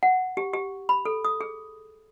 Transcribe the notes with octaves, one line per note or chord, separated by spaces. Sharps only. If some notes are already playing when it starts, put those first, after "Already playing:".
F#5
G4
G4
B5
A4
D#6
G#4